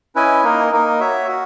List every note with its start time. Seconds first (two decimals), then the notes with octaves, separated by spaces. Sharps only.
0.16 C#4 E4 B4 D#5 G#5
0.44 A#3 D#4 A#4 D#5
0.72 A#3 D#4 A#4 D#5
1.00 F#4 C#5 E5
1.28 F#4